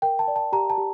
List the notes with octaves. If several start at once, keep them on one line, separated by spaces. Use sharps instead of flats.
A#4 G5
A5
D5
A5
G4 A#5
A5
G4